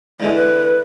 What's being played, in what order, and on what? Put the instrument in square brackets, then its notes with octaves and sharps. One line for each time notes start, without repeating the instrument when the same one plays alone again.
[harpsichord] E2 D3 E3 [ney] G#3
[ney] B4